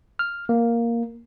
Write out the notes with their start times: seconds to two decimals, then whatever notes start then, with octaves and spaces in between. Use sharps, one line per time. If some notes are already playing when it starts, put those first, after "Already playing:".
0.19 F6
0.49 A#3